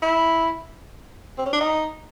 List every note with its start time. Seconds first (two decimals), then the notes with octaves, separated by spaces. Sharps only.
0.02 E4
1.38 C4
1.46 C#4
1.53 D4
1.60 D#4